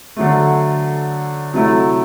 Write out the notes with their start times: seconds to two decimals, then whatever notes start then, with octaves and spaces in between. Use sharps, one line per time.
0.16 D3 F#3 A3
1.53 C3 F#3 A3 E4